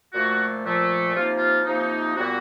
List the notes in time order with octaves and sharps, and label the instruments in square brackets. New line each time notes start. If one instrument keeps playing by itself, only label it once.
[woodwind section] A#2 F3 A3 F#4
A#2 F3 A3
C3 F3 A#3 D#4 F4
F4
C3 F3 A#3 D#4
A#2 G3 B3 F#4